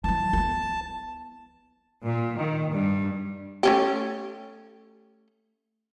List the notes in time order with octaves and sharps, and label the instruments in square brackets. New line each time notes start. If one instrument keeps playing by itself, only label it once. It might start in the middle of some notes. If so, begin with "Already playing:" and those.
[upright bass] E3 F#3 [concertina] A5
[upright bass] B3 E4
[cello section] A#2
D#3
G2
[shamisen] A3 C#4 G4